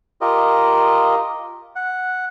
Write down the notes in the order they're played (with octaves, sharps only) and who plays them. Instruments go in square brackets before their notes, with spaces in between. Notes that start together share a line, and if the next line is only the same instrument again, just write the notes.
[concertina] F4 G4 A#4 D#5
F#5